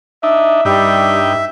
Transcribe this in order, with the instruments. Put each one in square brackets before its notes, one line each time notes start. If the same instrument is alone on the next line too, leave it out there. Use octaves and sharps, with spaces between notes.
[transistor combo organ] D4 D#4 [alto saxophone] E5
[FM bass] G2 [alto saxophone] G3 [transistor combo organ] D#4 G4 [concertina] E5